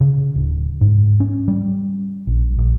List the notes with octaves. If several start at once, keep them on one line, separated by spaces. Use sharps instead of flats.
C#3
D1
G#2
C#4
G3
A#1
A#1